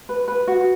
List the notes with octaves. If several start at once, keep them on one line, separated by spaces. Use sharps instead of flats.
B4
B4
F#4